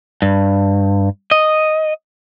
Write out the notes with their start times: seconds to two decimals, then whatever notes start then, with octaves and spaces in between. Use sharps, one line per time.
0.22 G2
1.31 D#5